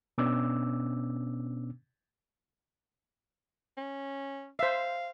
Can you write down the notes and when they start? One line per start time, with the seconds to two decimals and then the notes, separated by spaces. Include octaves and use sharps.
0.18 B2 B3 C#4 D4 D6 E6
3.77 C#4
4.59 C5 E5 F5